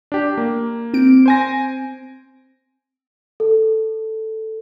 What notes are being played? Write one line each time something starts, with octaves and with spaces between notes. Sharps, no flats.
D4 G4
A#3
C4 D7
C5 G#5 A#6
A4